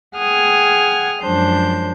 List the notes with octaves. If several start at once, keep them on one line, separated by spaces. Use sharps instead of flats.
G#4 F#5 G5 D#6 F6 G#6
F#2 F3 G#3 D4 C5 G6